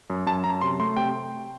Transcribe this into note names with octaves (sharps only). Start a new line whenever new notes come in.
F#2
F#2 A5
F#2 A#5
C3 C6
A3 C6
C3 G5